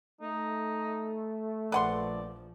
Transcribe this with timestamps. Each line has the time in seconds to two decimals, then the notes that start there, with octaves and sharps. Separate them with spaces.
0.21 A3 D#4
1.72 A#1 F3 B4 D5 F#5 C6